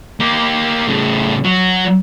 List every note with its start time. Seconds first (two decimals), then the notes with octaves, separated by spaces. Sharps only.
0.20 A#3 G4
0.87 A2 C#3
1.45 F#3 F#4